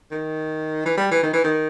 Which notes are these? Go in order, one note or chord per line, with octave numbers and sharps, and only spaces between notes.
D#3
E3
G3
E3
D#3
E3
D#3